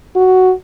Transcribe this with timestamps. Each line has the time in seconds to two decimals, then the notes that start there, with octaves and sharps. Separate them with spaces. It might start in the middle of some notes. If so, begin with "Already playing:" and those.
0.16 F#4